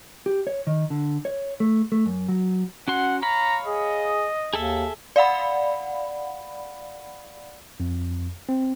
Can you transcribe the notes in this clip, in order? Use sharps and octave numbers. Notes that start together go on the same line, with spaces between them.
G4
C#5
D#3
D3
C#5
A3
A3
F#2
F#3
C#4 F#4 F#5 C6
C#5 F5 A#5 B5
G#4 D#5
D#2 G#4 A4 E5
D5 F5 F#5 B5
F2
C4